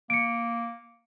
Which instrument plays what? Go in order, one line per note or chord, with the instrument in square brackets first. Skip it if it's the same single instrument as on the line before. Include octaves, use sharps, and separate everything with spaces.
[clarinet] A#3 [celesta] C#7 D7